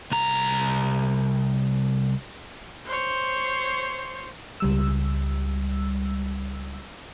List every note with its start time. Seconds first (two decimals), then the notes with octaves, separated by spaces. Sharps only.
0.11 C2 A#5
2.86 C5 C#5
4.60 C#2 G3 E6